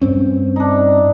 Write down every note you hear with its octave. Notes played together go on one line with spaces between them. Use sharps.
G2 C4 C#4
D4 D#4